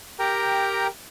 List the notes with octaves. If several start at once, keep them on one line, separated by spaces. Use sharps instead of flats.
G4 A#4 G5 A#5